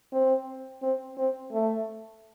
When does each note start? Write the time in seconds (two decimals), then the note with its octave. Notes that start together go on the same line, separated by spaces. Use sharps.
0.13 C4
0.82 C4
1.17 C4
1.52 A3